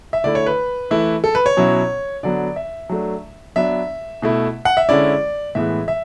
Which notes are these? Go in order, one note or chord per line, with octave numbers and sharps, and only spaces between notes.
E5
D3 A3 E4 D5
C#5
B4
E3 A3 E4
A4
B4
C#5
B2 F#3 C#4 E4
D3 F#3 B3 D5
E5
F#3 A3 D4
F#3 B3 D4 E5
B2 A3 E4
F#5
E5
D3 G#3 C#4 E4 D5
A2 E3 G#3 B3 E5
E5